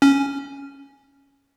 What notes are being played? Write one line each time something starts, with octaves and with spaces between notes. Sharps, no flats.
C#4